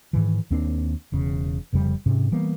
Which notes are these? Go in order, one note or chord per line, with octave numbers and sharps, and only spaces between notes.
G#2 D#3 E3
D#2 A#3 C4 D4
E1 E2 C#3
F1 F2 C#3 G3
G#2 C3 C#4
E3 G3 A#3 B3